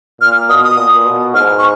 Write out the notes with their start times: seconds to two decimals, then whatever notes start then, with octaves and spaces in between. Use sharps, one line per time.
0.21 A#2 F6
0.49 B2 D#6
0.64 D#6
0.77 A#2
1.06 B2
1.35 G#2 F6
1.58 C#6